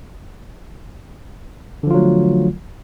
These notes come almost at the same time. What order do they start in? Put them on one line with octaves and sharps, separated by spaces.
D3 F3 F4 F#3 A3